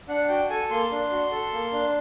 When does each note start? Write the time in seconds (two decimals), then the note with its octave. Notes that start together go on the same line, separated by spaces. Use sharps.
0.08 D4 F#5
0.28 F#4 G5
0.50 A4 G#5
0.70 A#3 C6
0.91 D4
1.12 F#4
1.32 A4
1.52 A#3
1.72 D4